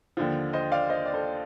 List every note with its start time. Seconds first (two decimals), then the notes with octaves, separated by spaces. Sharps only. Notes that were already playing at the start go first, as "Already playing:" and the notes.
0.17 D#2 D3 F3
0.53 C5 D#5
0.72 D5 F5
0.89 C5 D#5
1.06 D5
1.14 A4 C5